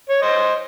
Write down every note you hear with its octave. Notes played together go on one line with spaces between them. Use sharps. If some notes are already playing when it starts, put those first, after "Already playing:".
C#5
C5 D#5